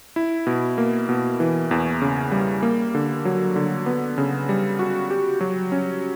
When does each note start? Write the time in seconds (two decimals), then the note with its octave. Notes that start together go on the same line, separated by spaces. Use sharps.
0.16 E4
0.47 B2
0.78 A#3
1.09 B2
1.40 E3
1.71 E2
2.02 C#3
2.32 G3
2.62 A#3
2.95 D3
3.25 F#3
3.56 D3
3.86 B3
4.18 C#3
4.49 G3
4.79 F#4
5.10 G4
5.41 F#3
5.72 C#4